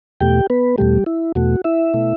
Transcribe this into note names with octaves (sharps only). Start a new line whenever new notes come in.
E2 B2 A3 G4 G5
B3 B4
E2 B2 G3 A3 G4
E4
E2 B2 A3 F#4
E4 E5
B2 A3